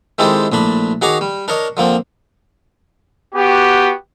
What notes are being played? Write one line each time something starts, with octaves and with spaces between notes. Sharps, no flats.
D#3 G#3 C4 E4 G4 A4
A#1 A2 D4 B5
D#3 F#4 G#4 C#5 A#5 D6
G3
D4 A#4 C#5 D#5
D3 F3 A#3 C4
B3 F#4 G4